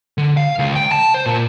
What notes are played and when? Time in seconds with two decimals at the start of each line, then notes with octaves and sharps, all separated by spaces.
0.18 D3
0.37 F5
0.59 C#2
0.76 G5
0.92 A5
1.14 C5
1.26 A#2